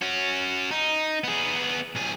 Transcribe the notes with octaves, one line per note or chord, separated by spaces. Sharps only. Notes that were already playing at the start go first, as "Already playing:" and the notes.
C#4 F#4
D#4
B3 G#4
B1 G#4